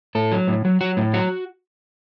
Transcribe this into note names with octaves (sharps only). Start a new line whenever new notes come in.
A2 A4
F#3
A2
F#3
F#3 F#4
A2
F#3 F#4